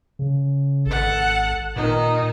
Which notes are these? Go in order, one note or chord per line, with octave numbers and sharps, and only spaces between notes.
C#3
G#1 A4 F#5
A#2 D#3 D#4